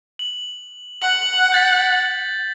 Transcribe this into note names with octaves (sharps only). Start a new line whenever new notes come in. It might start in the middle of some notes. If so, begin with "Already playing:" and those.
F#7
F#5 F#7
G6 A6 B6